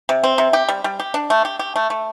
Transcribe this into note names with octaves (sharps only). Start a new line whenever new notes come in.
C3
C4
C3
G4
G3
G3
G4
D4
A3
G4
G4
A3
A3